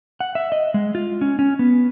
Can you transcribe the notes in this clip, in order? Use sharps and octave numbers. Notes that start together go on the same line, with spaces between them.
F#5
E5
D#5
G#3
F4
C#4
C#4
B3